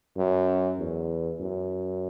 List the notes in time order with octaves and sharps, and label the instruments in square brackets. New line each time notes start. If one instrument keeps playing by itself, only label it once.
[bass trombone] F#2
E2
F#2